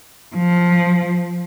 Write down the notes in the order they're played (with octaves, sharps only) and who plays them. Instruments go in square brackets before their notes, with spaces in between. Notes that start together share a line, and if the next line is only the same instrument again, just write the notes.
[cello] F3